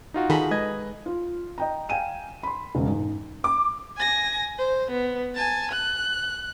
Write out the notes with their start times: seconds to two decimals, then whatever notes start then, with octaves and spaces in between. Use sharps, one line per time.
0.14 D#4 F4 F#4
0.30 D#3 G#4 A4 B5
0.51 G#3 B4 D#5 G#6
1.06 F4
1.58 D#5 G5 A#5
1.89 F5 G5 G#5 D#7 E7
2.43 B5 C6
2.75 E1 C#3
2.87 G#2
3.44 D6
3.97 G#5 A#6
4.58 C5
4.90 B3
5.35 G#5 A5
5.71 F#6